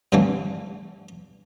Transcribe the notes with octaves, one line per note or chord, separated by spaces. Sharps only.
G2 D3 E3 A3 A#3 C4